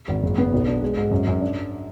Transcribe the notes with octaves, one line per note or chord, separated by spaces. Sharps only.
G#1
F#1
B3
B1
D4
G#3
G#2
F#2
F#2
D4